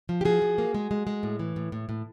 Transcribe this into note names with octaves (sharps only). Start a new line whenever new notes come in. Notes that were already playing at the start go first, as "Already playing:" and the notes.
F3
G4
F3 F#4 G#4
F3
A#3
G#3
G#3
G#3
A2
E3
A2
A2
A2